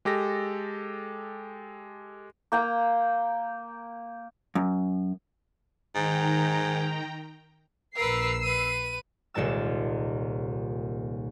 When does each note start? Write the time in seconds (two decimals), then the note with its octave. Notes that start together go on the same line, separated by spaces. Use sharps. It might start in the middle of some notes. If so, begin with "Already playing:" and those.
0.05 G#3 G4 A4 A#6
2.52 A#3 G5 A#5
4.55 F#2
5.95 G#2 D#3 G5 A#5
7.96 A#1 A#4 B4 E6 C7
8.43 B4 D#7
9.34 D#1 C2 A#2 G#3 A5 E6